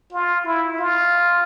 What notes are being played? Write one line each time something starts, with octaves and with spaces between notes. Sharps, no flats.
F4
E4
F4